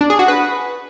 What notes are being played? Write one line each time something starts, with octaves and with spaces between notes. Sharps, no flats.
D4
G#4
F#4
B4